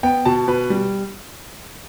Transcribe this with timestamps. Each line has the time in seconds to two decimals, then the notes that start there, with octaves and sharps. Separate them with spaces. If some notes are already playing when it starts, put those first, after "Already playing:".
0.03 B3 G5
0.25 B2 A5
0.48 B2 B4
0.70 G3